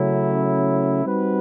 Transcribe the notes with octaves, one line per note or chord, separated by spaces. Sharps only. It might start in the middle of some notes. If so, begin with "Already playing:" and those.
Already playing: C#3 F#3 A3 C#4 E4
G3 C4 D#4 F#4 B4